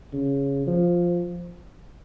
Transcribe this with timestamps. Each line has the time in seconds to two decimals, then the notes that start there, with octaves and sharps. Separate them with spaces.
0.13 C#3
0.67 F3